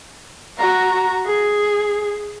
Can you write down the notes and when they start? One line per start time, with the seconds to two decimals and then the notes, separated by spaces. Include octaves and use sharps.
0.58 F#4 A#5
1.26 G#4